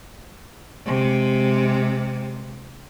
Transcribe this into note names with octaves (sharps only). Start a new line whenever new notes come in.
C3 G#3